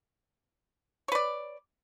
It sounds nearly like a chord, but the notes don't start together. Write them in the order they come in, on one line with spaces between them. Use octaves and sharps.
C#5 B4 D5